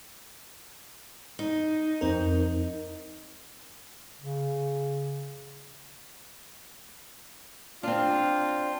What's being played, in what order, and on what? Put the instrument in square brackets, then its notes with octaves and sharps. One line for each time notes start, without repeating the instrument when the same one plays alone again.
[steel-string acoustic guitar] D#4
[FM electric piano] F2 C4 A#4
[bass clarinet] C#3
[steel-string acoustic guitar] C4 D4 [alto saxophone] F4